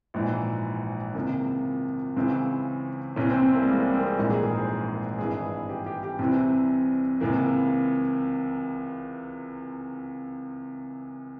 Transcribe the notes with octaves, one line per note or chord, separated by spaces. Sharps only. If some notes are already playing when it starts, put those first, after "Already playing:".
A#1 G#2 E3
C#2 C3 E3 A#3
C#2 C#3 E3 C4
C2 C3 E3 C#4
C4
C4
A#3
G3
G#3
G3
C4
A#4
G#4
A#1 G#2 E3 G4
G#4
A#4
C5
A#4
G#1 G2 E3 G#4
G4
G4
G4
C2 C3 E3 C4
C#2 C3 E3 A#3